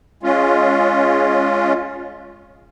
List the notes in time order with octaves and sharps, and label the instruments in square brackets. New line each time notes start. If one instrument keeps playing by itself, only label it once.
[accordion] G#3 C#4 F4